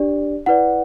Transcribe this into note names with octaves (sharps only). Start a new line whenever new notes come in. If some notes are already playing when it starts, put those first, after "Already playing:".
Already playing: D4 G4 D5
E4 B4 D5 F#5